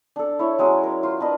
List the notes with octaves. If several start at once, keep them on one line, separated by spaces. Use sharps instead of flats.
D4 A4
E4 C#5
F#3 G#3 C#4 D6
A#4
F4 C5
D4 B4 D#5